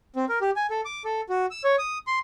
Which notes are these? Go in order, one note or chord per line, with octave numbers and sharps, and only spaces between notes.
C4
A#4
G4
G#5
A4
D6
A4
F#4
E6
C#5
D#6
C6